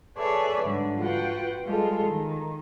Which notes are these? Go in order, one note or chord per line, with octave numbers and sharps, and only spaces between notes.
G#4 A4 B4 C#5 D5 E5
G#2 D3 G3
F4 F#4 B4 F#5 G5
G3 G#3 F4 A4
D#3